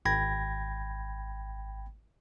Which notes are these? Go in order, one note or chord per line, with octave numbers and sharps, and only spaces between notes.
G#1 G5 B5 G#6 A#6